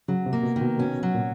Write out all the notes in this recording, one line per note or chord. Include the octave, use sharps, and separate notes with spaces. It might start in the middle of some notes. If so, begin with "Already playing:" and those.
C#3 F#3
C3
A#3
B2
D#3
B2
B2 C#4
F#3
A#2